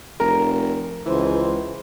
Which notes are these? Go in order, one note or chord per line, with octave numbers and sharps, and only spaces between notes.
F1 A#4
C#2 E3 C5